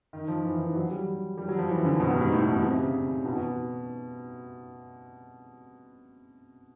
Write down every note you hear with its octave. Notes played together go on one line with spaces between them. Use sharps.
D#3
F3
E3
D#3
E3
F#3
G3
G3
F#3
F3
E3
D3
B2
G2
G#2
A2
B2
B2
C3
C#3
C#3
B2
B2